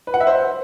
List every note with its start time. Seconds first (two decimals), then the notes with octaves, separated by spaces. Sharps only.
0.07 B4
0.14 F#5
0.20 E5
0.27 C5